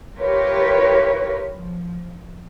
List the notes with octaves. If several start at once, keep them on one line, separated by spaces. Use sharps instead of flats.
E4 F4 G4 A#4 B4 C#5
F3